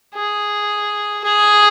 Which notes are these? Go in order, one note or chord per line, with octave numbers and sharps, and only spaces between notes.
G#4
G#4